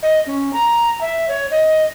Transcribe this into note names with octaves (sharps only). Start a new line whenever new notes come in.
D#5
C#4
A#5
E5
C#5
D#5